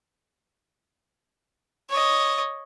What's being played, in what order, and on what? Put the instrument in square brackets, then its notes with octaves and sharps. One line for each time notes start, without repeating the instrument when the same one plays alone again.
[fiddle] C#5 D#5